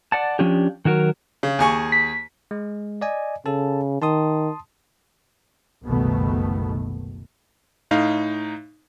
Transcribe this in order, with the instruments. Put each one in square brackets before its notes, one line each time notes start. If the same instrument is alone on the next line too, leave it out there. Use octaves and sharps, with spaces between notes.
[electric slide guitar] D5 F#5 A5
F3 C#4 D4 G4
D#3 F#3 F#4 A#4
[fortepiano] C#3
D#2 G#4 C#6
[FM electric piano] B6
[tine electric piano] G#3
D5 D#5 G#5
[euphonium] C#3 [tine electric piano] A4 A5
[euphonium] D#3 [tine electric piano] A5 C6 D#6
[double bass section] F#1 C2 B2 D#3 A3 B3
[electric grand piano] A2 D#4 F5